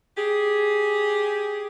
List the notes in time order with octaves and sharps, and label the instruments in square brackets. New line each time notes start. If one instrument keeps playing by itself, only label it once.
[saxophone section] G4 G#4